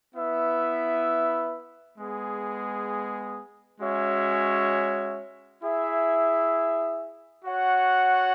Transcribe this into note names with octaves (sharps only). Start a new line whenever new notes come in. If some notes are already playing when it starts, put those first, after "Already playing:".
B3 E4 B4 E5
G#3 B3 G#4
G#3 C#4 F#4 C#5 E5
E4 G#4 E5
F#4 C#5 F#5